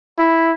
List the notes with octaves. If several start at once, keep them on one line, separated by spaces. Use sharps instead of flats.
E4